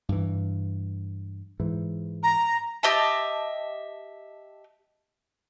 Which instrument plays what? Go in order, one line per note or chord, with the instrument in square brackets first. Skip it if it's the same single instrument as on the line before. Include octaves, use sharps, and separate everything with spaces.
[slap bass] G2 E3
G#2 E3
[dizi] A#5
[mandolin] G4 D#5 E5 A5